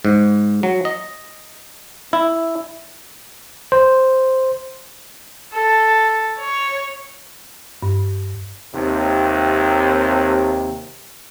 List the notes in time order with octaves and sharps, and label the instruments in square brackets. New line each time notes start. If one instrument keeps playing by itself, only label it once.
[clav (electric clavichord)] G#2
F#3
D#5
E4
[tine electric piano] C5
[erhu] A4
C#5
[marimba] G2
[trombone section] D#2 C3